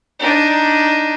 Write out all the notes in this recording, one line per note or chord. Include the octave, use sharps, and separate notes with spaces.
D4 D#4